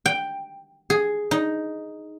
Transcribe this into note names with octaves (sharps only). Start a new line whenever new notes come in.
G5
G#4
D#4